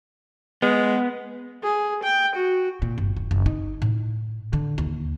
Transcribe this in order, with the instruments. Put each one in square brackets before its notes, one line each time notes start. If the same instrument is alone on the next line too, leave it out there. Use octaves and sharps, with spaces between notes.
[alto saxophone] G#3 [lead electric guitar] B3
[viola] G#4
G5
F#4
[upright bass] A#2
G1
D#1
F#1
D#4
A2
D3
D#2